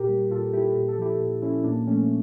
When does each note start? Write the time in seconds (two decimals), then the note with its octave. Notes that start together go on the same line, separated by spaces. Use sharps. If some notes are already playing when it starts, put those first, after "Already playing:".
Already playing: A#2 G4 A#4
0.09 G3
0.31 A#2 F4 A4
0.53 G3 E4 G4
0.75 A#2 G4
0.88 A4
0.98 F3 E4 G4
1.20 A#2
1.42 F3 C#4 E4
1.64 A#2 A#3 D4
1.87 F3 A3 C#4